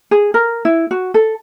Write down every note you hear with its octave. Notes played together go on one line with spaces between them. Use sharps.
G#4
A#4
E4
F#4
A4